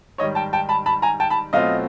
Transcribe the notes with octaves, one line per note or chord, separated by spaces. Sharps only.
G#2 D#3 G3 C#5 D#5
G5 A5
G5 A5
A5 B5
A5 B5
G#5 A#5
G5 A5
A5 B5
B2 F#3 A3 C4 F4 D#5 F5